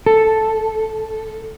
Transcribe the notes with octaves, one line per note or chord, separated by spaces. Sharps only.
A4